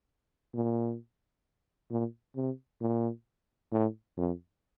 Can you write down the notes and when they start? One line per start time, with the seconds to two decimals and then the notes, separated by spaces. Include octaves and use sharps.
0.54 A#2
1.90 A#2
2.36 C3
2.81 A#2
3.72 A2
4.17 F2